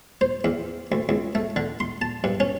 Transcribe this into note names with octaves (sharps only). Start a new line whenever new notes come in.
C5
E2
D2
C#2
A3
D3
C6
A5
G2
C#4